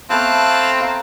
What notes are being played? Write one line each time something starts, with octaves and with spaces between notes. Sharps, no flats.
A3 B3 C4 F5 G5 A5 F#6
F5 A#5